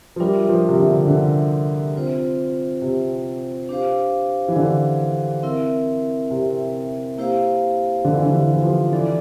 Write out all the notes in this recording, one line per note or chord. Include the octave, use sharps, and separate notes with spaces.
F3
G3 D4 F4 A#4 E5
F3
C3
D3
D3
C4 F4 C5
C3
D4 G4 C5 F5
E3
D3
C4 E4 A#4 E5
C3
A#3 E4 G4 C5 F5
D3
E3
D3
E3
E3
F3
E3 D4 A4 D5